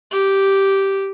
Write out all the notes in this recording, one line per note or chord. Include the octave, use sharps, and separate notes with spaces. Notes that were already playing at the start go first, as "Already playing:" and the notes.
G4